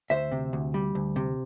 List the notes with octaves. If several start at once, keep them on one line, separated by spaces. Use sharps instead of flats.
D2 C5 E5
C3
D2
G3
D2
C3